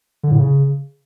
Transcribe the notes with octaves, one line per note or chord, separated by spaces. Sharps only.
D3
A2
C#3